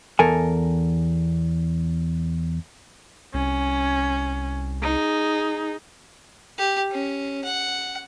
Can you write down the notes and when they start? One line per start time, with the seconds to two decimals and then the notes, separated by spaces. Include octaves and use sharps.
0.19 E2 A4 A#4 G#5
3.34 C2 C#4
4.82 D#4 G#4
6.58 G4
6.91 C#4
7.44 F#5